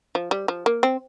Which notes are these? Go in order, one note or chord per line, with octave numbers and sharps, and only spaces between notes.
F3
G3
F3
A#3
C4